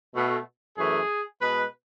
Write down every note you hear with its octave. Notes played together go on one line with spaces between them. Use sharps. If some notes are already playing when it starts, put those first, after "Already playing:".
B2 A3
F#2 E3 A3 G#4
B2 G#3 B4